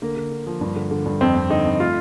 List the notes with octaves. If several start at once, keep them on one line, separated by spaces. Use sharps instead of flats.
D3 A#3
D3
D3
F3
G2
D3
D3
G2
F2 C4
F2
D3 D#4
F2
A3 F4